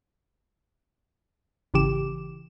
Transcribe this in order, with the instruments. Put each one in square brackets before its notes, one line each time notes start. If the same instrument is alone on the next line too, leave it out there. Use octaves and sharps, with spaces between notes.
[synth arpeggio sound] G#1 C#3 E3 G4 D6 E7